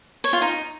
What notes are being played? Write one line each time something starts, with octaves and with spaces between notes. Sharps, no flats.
C#5
F4
D#4